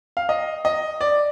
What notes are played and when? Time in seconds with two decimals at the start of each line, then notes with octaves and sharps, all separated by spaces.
0.17 F5
0.29 D#5
0.65 D#5
1.01 D5